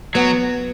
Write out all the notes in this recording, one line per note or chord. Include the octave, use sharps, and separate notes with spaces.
F#3 B3